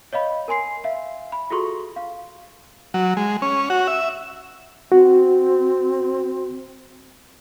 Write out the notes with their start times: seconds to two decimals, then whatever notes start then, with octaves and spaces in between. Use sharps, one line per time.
0.13 C#5 D#5 F5 B5
0.48 A#4 G#5 C6 C7
0.84 E5 F5
1.32 B5
1.50 F4 F#4 G#4 A4 C6 C#6
1.96 F5
2.94 F#3
3.17 G#3
3.42 C#4
3.70 F#4
3.87 E5
4.92 C4 F#4